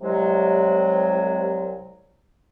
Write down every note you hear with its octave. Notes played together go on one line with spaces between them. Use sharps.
C2 C3 F#3 G#3